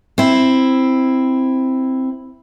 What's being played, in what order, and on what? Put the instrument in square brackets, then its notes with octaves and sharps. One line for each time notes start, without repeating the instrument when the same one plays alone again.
[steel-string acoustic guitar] C4 E4